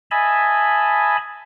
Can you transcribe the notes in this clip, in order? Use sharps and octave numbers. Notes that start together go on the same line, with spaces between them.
D#5 E5 G#5 A5 B5